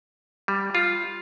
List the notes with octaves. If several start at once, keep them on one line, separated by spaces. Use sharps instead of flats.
G3
F4